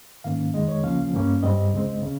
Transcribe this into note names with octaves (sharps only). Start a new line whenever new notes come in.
G#2 D#3 A#3 C#4 F5
F2 D#3 G#3 D#5
C#5
C#2 C#3 F3 A#3 C#4 F5
G2 G3 A#3 C#4
G2 G3 C4 D#5
C#2 C#3 G#3 C4
C#3